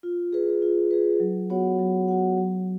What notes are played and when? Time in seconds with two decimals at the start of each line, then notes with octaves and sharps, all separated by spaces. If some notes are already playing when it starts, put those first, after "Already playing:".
0.03 F4
0.33 G#4 B4
0.62 F4
0.91 G#4 B4
1.20 F#3
1.50 B3 F#4 C#5 F#5
1.79 F#3
2.08 B3 F#4 C#5 F#5
2.38 F#3